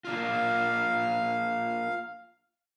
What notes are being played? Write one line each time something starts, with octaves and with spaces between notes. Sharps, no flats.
A#3 D4 F4 F5